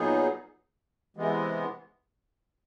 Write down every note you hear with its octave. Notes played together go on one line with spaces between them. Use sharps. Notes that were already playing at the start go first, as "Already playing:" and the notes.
Already playing: A#2 F#3 B3 D#4 G#4
C3 E3 G#3 B3